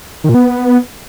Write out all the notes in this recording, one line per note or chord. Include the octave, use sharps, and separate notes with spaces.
D#3
A#2
B3